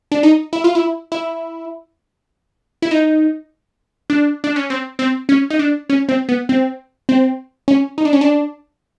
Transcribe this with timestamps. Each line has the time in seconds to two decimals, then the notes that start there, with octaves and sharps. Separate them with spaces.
0.12 D4
0.23 D#4
0.53 E4
0.64 F4
0.75 E4
1.12 E4
2.82 E4
2.91 D#4
4.10 D4
4.44 D4
4.56 C#4
4.70 C4
4.99 C4
5.29 C#4
5.50 D#4
5.59 D4
5.90 C#4
6.09 C4
6.29 B3
6.49 C4
7.09 C4
7.68 C#4
7.98 D#4
8.05 D4
8.13 C#4
8.21 D4